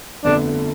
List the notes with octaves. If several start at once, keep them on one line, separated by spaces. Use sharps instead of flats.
G1 F2 D3 A3 D4